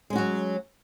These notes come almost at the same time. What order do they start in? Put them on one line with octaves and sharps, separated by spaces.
G#3 C#4 F#4 F#3